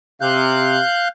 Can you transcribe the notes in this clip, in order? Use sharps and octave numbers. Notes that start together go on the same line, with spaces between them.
C3 F5 F#6 G6